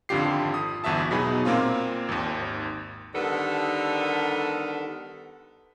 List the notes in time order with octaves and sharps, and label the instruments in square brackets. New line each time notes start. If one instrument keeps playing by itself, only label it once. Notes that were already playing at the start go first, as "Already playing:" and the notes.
[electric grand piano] G#1 F2 D3 F4 G4 C7
D#6
G1 E2 F#4 E5 A5
B2 F#3 D#4 G#4 B5
A#2 A#3 C4 F4
G#1 D#2
[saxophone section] D3 D#3 G3 B3 A4 A#4